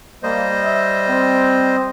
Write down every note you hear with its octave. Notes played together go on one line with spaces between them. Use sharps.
G3 A#3 C5 D#5
E5
C4